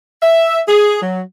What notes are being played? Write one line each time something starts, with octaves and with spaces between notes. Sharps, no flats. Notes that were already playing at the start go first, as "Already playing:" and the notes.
E5
G#4
F#3